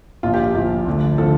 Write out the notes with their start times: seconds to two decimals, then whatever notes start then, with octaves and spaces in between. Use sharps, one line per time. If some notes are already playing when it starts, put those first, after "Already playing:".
0.23 A#1 A#2 F3 F4
0.34 G4
0.45 G4
0.55 A#1 A#2 F3
0.86 D2 D3 F3
1.18 D3 F3 A4